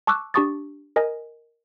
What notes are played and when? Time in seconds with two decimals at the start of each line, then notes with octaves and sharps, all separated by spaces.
0.07 A5 C#6 D6 E6 F#6
0.34 D4 G4 A5 C#6 D#6 A6
0.96 A#4 D#5 G#5